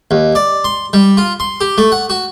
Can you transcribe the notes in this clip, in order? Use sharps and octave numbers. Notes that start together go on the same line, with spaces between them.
D#2
D5
C6
G3
F4
C6
G4
A3
F#5
F#4